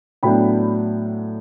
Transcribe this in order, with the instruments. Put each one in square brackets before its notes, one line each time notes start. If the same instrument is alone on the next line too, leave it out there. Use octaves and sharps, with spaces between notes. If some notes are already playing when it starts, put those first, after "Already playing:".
[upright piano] A2 F#3 B3 D4 G5 B5